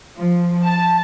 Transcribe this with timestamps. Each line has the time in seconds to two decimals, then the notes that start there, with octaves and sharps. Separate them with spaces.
0.16 F3
0.64 A5